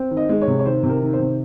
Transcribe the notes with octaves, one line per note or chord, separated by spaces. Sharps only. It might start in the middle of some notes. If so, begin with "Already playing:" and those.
Already playing: C4
D#3
D#5
G#3
C#5
C3
C#5
D#3 C5
C3
A#4
D#3
C5
C3